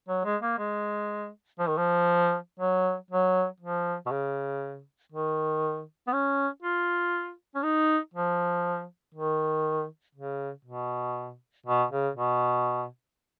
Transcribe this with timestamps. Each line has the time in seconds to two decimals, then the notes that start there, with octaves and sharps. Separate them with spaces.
0.08 F#3
0.25 G#3
0.42 A#3
0.58 G#3
1.59 F3
1.68 D#3
1.78 F3
2.60 F#3
3.11 F#3
3.60 F3
4.06 B2
4.11 C#3
5.12 D#3
6.08 B3
6.13 C#4
6.62 F4
7.55 C#4
7.63 D#4
8.14 F3
9.14 D#3
10.15 C#3
10.65 B2
11.66 B2
11.91 C#3
12.16 B2